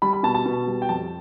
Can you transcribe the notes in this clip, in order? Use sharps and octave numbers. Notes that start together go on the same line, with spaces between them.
G3 B5
B5
B2 A5
A5
B2
G3
G5
F2 A5